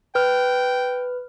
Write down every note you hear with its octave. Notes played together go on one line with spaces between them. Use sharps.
B4 G5 F6